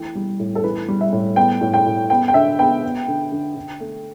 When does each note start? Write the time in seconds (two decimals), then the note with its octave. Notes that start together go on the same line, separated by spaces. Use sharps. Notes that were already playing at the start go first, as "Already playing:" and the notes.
Already playing: E3 A3 G5
0.15 G3
0.39 A2
0.55 A4
0.64 E3 B4
0.88 G3
1.01 E5
1.12 A2
1.36 B3 G5
1.61 A2
1.74 G5
1.86 A2
2.10 B3 G5
2.28 G5
2.34 D3 E5
2.59 B3 G5
2.83 B3
3.08 D3
3.32 D3
3.56 D3
3.80 A3